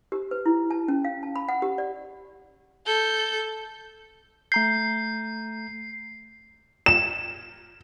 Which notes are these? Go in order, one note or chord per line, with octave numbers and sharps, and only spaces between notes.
G4
B4
E4
A5
C#4
F5
A5
B5
F#5
G4
D5
A4 G6
A3 A#5 G6 C7
E7